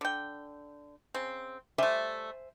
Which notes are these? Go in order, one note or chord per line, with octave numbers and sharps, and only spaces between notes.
D3 G5
C#3 C4
G3 A3 C5 E5 G#5